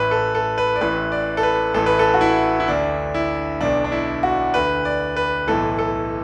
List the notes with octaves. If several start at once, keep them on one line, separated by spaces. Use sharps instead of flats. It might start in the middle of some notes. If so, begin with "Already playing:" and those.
Already playing: A1 A2 E3 B4
A4
A4
B4
D5
A1 A2 E3 B4
D5
A4
B4
A1 A2 E3 A4
B4
A4
F#4
E4
E4
D2 D3 D4
E4
B1 B2 D4
D4
E4
F#4
D2 D3 B4
D5
B4
B1 A2 E3 A4
A4